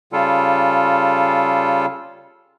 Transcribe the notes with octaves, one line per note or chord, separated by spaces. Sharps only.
C#3 G3 F4 A4